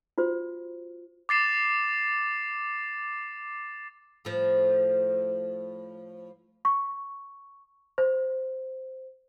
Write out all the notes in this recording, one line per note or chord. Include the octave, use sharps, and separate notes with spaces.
F4 F#4 C5
D6 A6 C7 E7
A2 F3
C#6
C5